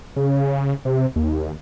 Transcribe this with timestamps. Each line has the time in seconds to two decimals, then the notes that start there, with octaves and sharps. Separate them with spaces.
0.16 C#3
0.85 C3
1.16 D#2